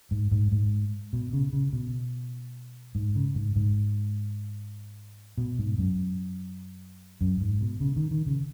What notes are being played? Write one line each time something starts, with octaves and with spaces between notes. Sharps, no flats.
G#2
G#2
G#2
B2
C#3
C#3
B2
G#2
C#3
G#2
G#2
B2
G#2
F#2
F#2
G#2
B2
C#3
D#3
D#3
C#3